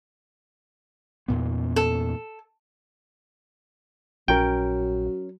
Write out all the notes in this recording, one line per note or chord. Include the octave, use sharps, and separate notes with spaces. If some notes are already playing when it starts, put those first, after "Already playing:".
E2 A#2 B3
A4
A#1 F#3 C#4 A#4 G5